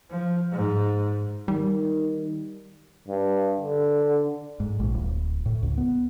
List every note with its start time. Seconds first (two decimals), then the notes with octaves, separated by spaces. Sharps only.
0.10 F3
0.52 G#2
1.48 D#3 G3
3.08 G2
3.60 D3
4.60 G#2
4.80 A#1
4.94 D1
5.46 A2
5.63 C#2
5.78 B3